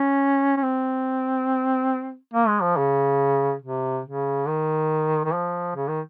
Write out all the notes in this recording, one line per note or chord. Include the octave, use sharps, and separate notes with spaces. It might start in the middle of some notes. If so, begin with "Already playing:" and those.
Already playing: C#4
C#4
C4
A#3
G#3
F3
C#3
C3
C#3
D#3
D#3
F3
C#3
D#3